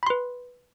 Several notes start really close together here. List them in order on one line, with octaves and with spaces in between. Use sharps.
B5 C6 B4